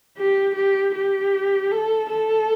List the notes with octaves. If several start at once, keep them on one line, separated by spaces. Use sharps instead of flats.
G4
G4
G4
A4
A4